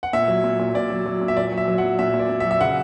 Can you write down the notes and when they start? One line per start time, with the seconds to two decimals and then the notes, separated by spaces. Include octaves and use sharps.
0.03 F#5
0.13 A#2 E5
0.28 F#3
0.44 A#2
0.59 A#2
0.75 A#2 D5
0.90 F#3
1.06 F#3
1.21 A#2
1.28 E5
1.37 A#2 D5
1.52 F#3
1.58 E5
1.68 F#3
1.78 F#5
1.84 A#2
1.99 A#2 E5
2.14 A#2
2.19 D5
2.30 A#2
2.40 E5
2.45 F#3
2.51 E5
2.61 C#3 F#5